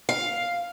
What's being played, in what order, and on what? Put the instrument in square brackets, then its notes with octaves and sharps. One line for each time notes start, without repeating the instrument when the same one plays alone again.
[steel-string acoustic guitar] F5